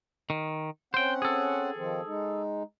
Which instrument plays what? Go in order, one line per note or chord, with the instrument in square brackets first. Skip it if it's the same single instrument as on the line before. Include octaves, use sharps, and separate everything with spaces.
[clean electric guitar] D#3
[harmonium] C4 C#4 F#5 [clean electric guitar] C5 G5
[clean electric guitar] G#4 A4
[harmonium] D#3 F3 C4
G#3 D#4